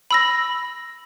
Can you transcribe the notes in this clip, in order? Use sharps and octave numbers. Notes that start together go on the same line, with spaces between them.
B5 E6 A#6